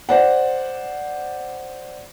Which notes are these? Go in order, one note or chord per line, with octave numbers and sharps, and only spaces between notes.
C5 D5 F#5